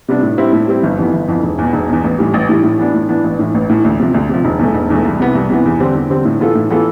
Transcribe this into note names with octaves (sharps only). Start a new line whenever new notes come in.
C3 G3 B3 D4
A2
G3 C4 E4
A2
G3 C4 E4
G1
F2 E3 B3
G1
F2 E3 B3
E1
E2 B2
E1
E2 B2
A1
A2 E3 G3
A1
A2 E3 G3
A2
E3 B3 D4
A2
E3 B3 D4
A1
A2 E3
A1
A2 E3
D2
C3 F3
D2
C3 F3
E1
E2 B2 A3
E1
E2 B2 A3
C2
C3 E3 B3
C2
C3 E3 B3
E2
D3 G3 C4
E2
D3 G3 C4
A2
E3 B3 F4 A4
A2
E3 B3 F4 A4